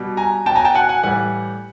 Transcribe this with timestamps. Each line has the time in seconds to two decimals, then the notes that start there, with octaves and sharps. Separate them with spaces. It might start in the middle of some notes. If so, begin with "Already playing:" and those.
Already playing: B2 G3
0.17 G#5 A#5
0.46 B2 F#3 G5 A5
0.56 G#5 A#5
0.65 G5 A5
0.74 F#5 G#5
0.89 F#5 G#5
1.03 A2 E3 G3 F#5 G#5